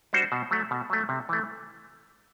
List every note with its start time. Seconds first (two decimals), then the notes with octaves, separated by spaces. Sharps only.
0.13 G3 D4 F#4 C5
0.32 B2
0.51 F#3 A3
0.71 B2
0.90 F#3 A3
1.09 C3
1.29 E3 A3